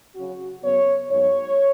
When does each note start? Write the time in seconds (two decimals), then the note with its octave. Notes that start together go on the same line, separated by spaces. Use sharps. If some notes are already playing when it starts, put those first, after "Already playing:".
0.16 C#3 F#3 C#4 F#4
0.63 F#2 C#3 F#3 B3 C#5
1.10 G#2 F#3 B3 C#5